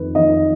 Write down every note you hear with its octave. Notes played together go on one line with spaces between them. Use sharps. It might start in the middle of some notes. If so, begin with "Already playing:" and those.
Already playing: F2 D#3 B4
F2 D#3 D#5